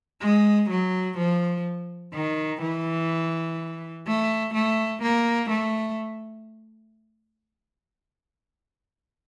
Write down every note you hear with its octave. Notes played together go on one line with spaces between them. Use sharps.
G#3
F#3
F3
D#3
E3
A3
A3
A#3
A3